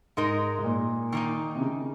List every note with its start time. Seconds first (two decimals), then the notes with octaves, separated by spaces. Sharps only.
0.17 G#2 G#3 D#4 A#4 D#5
0.59 G#2
0.64 A#2
1.12 D#3 A#3 D#4
1.55 C3
1.61 C#3